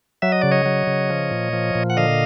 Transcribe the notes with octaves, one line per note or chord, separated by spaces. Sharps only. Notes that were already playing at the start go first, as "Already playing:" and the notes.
F#3 E5
D#5
C#3 D5
C#5 D#5
F#3
C#3
F3
A#2
F3
A#2
F#5
D3 D#5 F5